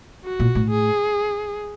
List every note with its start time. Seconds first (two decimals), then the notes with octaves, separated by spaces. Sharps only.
0.25 F#4
0.40 A#2
0.55 A2
0.71 G#4